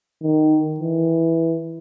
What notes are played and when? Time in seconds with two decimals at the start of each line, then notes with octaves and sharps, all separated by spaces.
0.22 D#3
0.80 E3